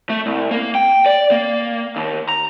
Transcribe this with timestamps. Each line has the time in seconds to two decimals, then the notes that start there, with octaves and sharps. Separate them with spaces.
0.10 A3
0.26 C2
0.51 A#3
0.75 G5
1.06 D5
1.31 A#3
1.96 D#2
2.29 A#5